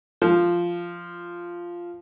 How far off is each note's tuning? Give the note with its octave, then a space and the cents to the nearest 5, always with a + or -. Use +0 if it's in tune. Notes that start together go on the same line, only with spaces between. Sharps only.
F3 -5